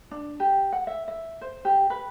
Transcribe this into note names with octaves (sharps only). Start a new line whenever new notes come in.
D4
G4
F#5
E5
E5
C5
G4
B4